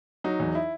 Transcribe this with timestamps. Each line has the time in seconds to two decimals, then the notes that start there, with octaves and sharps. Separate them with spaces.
0.24 F#3 D#4
0.40 E2
0.55 E4